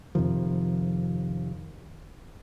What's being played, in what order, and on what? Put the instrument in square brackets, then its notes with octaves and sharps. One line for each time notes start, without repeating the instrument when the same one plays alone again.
[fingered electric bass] F2 C3 D#3 F3